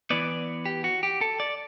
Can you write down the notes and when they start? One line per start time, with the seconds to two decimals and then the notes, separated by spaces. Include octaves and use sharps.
0.10 E3 B3 D5
0.66 G4
0.84 F#4
1.03 G4
1.21 A4
1.40 D5